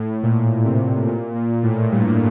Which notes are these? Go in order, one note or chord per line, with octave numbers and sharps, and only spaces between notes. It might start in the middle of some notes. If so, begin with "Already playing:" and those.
Already playing: A2
A#2
C3
A#2
A#2
A2
G2